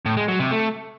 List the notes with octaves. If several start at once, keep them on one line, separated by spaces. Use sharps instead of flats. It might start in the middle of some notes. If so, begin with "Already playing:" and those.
A2
G#3
F#3
C3
A3